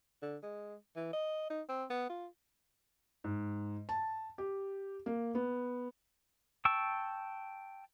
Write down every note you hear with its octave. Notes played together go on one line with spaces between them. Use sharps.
D3
G#3
E3
D#5
D#4
C4
B3
F4
G#2
A5
G4
A#3
B3
G5 A5 C#6 E6